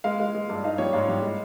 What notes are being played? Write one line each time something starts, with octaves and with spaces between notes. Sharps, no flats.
G#3 F5
G#3
G#3
G2
D#4 F5
G3 C#5
G#2 F5
G3
G#3